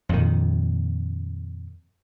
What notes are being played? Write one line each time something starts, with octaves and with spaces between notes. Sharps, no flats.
F2 A#2 D#3